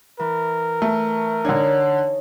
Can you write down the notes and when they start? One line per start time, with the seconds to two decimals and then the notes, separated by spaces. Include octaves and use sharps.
0.20 E3 A#4
0.82 A3
1.45 D3 D4 D#4 C#5 G#5